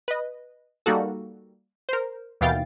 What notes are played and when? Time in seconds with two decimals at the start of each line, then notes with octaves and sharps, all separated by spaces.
0.08 B4 D#5
0.86 G3 A#3 D#4 F#4 A4
1.89 A#4 C5
2.41 D#2 B2 E3 F5 G5 A6